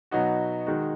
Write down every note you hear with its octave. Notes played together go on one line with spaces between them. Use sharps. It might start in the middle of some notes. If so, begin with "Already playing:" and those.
B2 F#3 B3 D#4 F#4
D#3 G#3 D#4 F#4